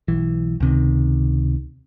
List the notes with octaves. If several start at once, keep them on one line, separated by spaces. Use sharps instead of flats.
B1 E3
C#2 C3 D#3